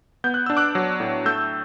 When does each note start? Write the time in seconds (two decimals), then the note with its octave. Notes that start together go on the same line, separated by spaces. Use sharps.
0.24 B3 G6
0.34 F#6
0.46 D4 E6
0.57 D6 F#6
0.75 F#3
1.00 A2
1.25 A3 E6 G6